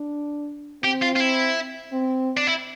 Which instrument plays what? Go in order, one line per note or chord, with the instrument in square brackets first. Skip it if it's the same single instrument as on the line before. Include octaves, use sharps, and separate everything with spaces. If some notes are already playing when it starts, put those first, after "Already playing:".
Already playing: [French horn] D4
[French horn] C4 [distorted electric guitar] G4
[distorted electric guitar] F4
F4
E4
[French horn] C4
[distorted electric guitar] D4
E4